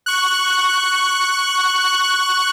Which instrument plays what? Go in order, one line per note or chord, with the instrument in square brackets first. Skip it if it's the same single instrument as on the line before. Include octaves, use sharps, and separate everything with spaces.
[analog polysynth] C#6 F#6